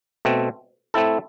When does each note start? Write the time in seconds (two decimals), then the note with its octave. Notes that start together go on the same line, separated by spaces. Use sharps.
0.25 B2 A3 C4
0.94 A3 C4 E4 A4